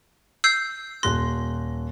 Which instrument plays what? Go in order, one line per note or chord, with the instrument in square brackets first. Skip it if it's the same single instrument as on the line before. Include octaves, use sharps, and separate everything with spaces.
[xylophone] E6 G6 C7
[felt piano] D#1 F#6 A#6 [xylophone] C6